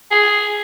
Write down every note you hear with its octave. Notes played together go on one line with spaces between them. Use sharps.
G#4